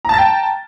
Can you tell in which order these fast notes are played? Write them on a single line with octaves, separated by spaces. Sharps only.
A#5 A5 A6 G5